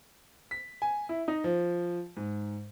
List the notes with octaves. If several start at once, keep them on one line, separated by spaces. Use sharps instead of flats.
B6
G#5
E4
D#4
F3
G#2